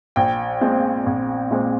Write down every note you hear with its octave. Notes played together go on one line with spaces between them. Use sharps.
A#1 G5
A#2 G#3 C4
A#1
A#2 G#3 C4